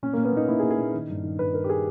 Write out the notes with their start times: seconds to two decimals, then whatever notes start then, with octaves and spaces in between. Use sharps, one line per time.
0.03 A#2 C#4
0.13 A#3
0.17 A#2
0.25 B3
0.33 A#2 D#4
0.49 A#2 E4
0.59 G#4
0.63 A#2
0.71 G#4
0.78 A#2
0.94 D#3
1.09 G2
1.24 D#3
1.39 G2 B4
1.54 D#3 A#4
1.64 G4
1.70 G#4